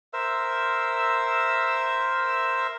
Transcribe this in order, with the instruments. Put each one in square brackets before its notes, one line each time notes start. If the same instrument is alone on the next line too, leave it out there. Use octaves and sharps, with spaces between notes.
[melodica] A#4 C5 E5 E6